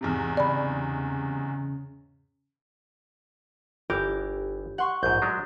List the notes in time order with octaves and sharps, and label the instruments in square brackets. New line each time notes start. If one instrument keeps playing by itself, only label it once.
[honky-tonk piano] E2 G#2 C3
[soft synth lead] C#3 [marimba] D5 B5
[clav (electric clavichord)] G1 E3 A#4 [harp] G4
[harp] F#5 C6 C#6
[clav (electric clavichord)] A#1 G#2 [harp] G6
[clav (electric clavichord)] F#3 G#3 D4